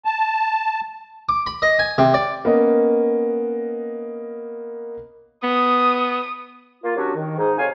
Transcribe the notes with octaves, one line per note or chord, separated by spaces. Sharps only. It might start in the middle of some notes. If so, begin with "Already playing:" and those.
A5
D6
B5
D#5
G#5
C3
D5
A#3 B3 C#4 D#5
B3 D#6
A#3 F4
D#3 F#3 C#4 D4 F#4 G4
D#3
G#2 D#4
F2 C3 C#5 F5 G#5